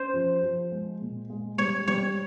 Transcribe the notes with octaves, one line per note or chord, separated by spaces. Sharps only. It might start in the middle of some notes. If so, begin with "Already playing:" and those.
Already playing: C#4 C5
F3
F3
G#3
A#2
G#3
G3 C#5
G3 C#5